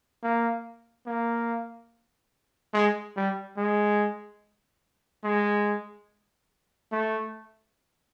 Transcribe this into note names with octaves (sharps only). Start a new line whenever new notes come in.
A#3
A#3
G#3
G3
G#3
G#3
A3